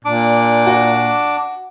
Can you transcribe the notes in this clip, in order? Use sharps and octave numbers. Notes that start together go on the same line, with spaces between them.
A#2 D4 D6
F#4